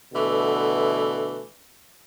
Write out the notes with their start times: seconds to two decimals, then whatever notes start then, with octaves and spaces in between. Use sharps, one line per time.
0.14 B2 D3 E3 A3